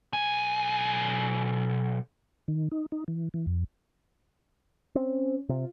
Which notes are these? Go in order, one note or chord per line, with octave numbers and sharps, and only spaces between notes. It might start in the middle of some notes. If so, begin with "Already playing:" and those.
B1 G#5
D#3
D#4
D#4
E3
E3
F2
C4 C#4
C3 F4